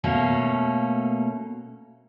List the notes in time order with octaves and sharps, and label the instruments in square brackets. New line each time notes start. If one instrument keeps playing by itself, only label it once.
[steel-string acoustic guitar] B2 A3 A#3 C#4